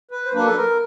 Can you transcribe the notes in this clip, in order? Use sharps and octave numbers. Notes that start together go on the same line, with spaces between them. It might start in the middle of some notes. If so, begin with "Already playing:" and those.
B4
C5
F#3 A#3 D4 B4
A4
A#4